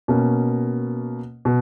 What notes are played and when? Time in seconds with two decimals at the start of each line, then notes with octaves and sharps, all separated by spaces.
0.08 B2 A#3 C#4
1.45 B2